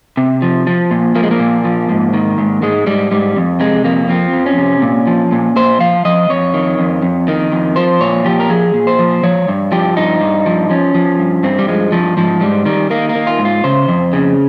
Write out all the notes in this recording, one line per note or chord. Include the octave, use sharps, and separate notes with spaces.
C3
F3
F3
A#2
F3 A#3
G#3
A#3
A#2
F3
G#2
D#3
G#2
G#2 G#3
G#2 G3
G#2 G3
F2
C3 G#3
F2 A#3
F3 C4
F2
C#4
C3
A#2
F3
A#2
A#2 C5
F3 F5
F3 D#5
F2 C#5
D#3
F2
F2
D#3
F2
F3 C5
A#2 C#5
F3 G4
A#4
F3 G#4
A#2
C5
F3
F3 C#5
G2
F3 G4
G2 D#4
G2
F3
F3 C#4
F3
G2
G2 C4
G3
F3 G#3
G2 F3
G#2 F3
G#2 G3
D#3 G3
D#3 A#3
A#3
D#3
F4
G#2
F4
C#3 C5
F2
C#3